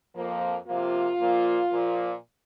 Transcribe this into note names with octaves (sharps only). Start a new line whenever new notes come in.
F2 F3 A#3
C3 F3 A#3 F4
A#2 F3 A#3
A#2 F3 A#3